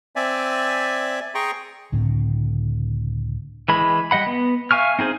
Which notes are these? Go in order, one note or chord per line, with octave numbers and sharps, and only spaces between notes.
C4 D5 E5 G#5
G#4 G5 A#5 C6 C#6
C#2 A2 D3 C4
E3 G#3 B5
G3 D#5 F#5 B5
B3
E5 F5 G#5 C#6 F6
C4 D#4 G#4 C5